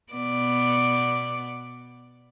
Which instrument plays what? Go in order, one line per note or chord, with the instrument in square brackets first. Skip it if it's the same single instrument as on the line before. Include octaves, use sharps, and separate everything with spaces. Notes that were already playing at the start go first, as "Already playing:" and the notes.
[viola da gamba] B2 B3 D5